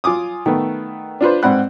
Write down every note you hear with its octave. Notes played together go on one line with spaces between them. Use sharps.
F4 G#5 D6 D#6
D#3 A3 B3
D4 F4 B4 C5
G#2 C4 D5 F#5 B5 F#6